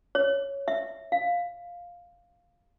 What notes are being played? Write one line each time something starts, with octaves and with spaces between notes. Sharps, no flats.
C#5
E5
F5